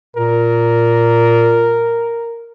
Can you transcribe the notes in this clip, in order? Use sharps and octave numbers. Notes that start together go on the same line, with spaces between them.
A#2 A#4